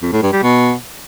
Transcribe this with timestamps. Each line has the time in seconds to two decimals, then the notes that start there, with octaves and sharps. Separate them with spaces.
0.02 F2
0.12 A2
0.23 G2
0.33 G3
0.43 B2